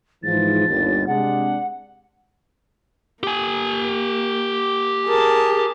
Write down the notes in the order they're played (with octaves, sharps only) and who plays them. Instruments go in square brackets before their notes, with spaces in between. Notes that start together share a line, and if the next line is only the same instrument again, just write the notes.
[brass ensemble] G#2 E3 F3 [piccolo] A6
[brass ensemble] G1 D#2
[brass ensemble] C3 G#3 D4 [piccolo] F#5
[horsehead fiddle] A#3 [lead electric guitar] G4 G#5
[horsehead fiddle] G#4 [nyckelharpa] A#4 A5